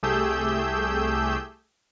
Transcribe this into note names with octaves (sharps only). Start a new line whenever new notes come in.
C2 A3 G4 G#4 E6 G6